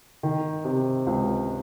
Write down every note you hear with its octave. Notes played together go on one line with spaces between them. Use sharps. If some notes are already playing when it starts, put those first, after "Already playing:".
D#3
C3
C#2